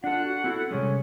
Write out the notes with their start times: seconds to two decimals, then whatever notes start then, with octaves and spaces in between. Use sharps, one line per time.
0.04 D4 F4 A4 F#5
0.25 F#4
0.44 C4 E4 F#4 A4
0.71 C3 G3 G#3 C#4